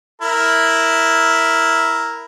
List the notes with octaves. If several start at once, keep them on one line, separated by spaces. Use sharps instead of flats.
E4 A#4